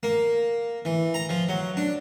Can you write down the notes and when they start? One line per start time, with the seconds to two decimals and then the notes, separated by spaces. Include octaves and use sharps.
0.03 A#3
0.85 E3
1.14 A#5
1.29 F3
1.49 F#3
1.77 D4